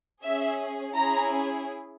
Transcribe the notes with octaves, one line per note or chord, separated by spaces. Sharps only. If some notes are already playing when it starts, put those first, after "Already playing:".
C#4 G#4 E5
C#4 E4 G#4 A#5